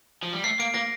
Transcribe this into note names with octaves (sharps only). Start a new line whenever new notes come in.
F3
G3
A3 C7
A#3 D7
A#3 A#6